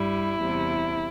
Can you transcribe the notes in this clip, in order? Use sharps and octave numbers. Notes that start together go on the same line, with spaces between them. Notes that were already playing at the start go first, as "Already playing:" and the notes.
Already playing: G2 G3 E4
E2 C3 G3